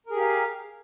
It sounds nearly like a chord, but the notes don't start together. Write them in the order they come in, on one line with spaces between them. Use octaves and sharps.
A#4 G#4 G4 F5